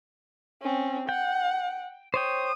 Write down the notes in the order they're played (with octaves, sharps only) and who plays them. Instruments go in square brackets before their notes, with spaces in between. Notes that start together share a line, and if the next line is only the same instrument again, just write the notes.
[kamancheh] C4 C#4
[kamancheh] F#5 [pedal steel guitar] G5
[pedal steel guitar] C5 C#5 G5 [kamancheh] D#6